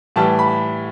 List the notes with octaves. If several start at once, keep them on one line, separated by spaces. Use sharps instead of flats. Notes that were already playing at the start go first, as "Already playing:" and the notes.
A2 E3 G3 A5
B5